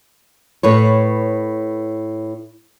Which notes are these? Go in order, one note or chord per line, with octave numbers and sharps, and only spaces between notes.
A2 B4 C#5